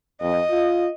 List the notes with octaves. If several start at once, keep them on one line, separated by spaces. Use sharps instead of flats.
F2 D#5
F4